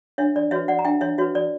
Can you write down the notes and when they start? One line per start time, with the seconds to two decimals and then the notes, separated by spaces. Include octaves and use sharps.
0.18 D4 C#5 E5
0.36 D5
0.51 F#4 B4 C#5 E5
0.68 D5 F#5
0.79 A#5
0.85 D4 E5 G5
1.01 C#5 E5
1.18 F#4 B4 C#5 E5
1.35 D5